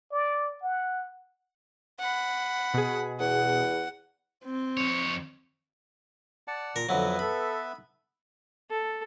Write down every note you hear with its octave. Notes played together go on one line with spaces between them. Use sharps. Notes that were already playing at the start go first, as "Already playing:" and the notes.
D5
F#5
F#5 B5
B2 G#4
E2 F#5
C4
F2 C#5
D5 F#5 A5
A#2 A#4
F2 D3 F#3 B3 B4 E5
A4 B5
A4